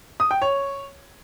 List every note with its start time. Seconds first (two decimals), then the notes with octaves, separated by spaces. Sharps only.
0.20 D#6
0.31 G5
0.42 C#5